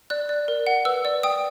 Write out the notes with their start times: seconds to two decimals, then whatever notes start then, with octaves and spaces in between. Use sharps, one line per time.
0.10 D5 F#6
0.29 D5
0.48 A#4
0.67 F#5
0.85 B4 E6
1.05 D5
1.23 G5 D#6